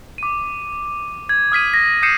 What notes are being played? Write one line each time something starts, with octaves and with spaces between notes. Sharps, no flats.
D6 D#7
G#6
D#6 F6 B6 D#7
A#6
D#6 G6 C7 C#7 D#7 E7